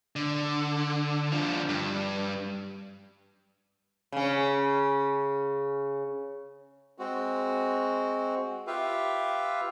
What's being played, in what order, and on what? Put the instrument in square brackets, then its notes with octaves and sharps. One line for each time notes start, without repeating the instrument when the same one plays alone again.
[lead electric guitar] D3
D3 F3
G2
[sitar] C#3 C#4
[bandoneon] G#3 C4 F#4
F4 G4 B4 E5 F5